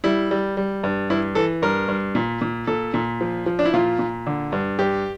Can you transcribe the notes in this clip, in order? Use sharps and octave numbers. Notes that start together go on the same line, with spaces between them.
G3 E4
G3
G3
G2
G2 E4
E3 A4
G2 A#4
G2
A#2
A#2
A#2 A4
A#2
F3
F3
D4
E4
A#2 F4
A#2
D3
G2
G2 G4